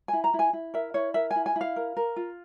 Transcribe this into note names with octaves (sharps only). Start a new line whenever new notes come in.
E4 G#5
A#5
E4
G#5
E4
A#4 E5
E4 C#5
A#4 E5
G#5
E4
G#5
E4 F5
A#4
A#4
F4